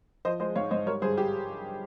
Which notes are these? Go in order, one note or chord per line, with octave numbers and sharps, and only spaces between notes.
F3 C5 D#5
G#3 C5 D#5
G#2 C#5 F5
G#2 C5 D#5
G3 A#4 C#5
G2 G#4 C5
G4